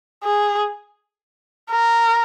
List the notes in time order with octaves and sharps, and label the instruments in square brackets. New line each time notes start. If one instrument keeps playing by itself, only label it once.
[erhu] G#4
A#4